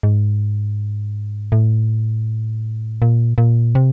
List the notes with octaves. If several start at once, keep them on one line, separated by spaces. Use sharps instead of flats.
G#2
A2
A#2
A#2
C3